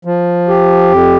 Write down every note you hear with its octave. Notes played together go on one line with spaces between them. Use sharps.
F3
G4
F2